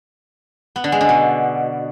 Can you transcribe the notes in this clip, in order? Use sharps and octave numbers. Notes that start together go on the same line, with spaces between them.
B3
D3
G#3
D3
B2